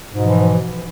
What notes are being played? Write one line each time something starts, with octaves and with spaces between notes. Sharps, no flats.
G#2 B2 E3 F3